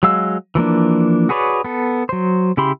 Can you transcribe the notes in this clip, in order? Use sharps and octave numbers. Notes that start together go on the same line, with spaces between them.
F#3 G#3 F5 E6
E3 F3 A#3 D4
F#4 G#4 B4 C#5 D5
B3 A4
F#3 C5
C#3 E4 G4 B5 C6